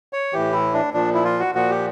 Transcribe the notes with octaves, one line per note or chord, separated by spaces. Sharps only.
C#5
A2 E3 G4
E4
D4
A#2 F3 D4
E4
F4
F#4
A#2 F3 F#4
G4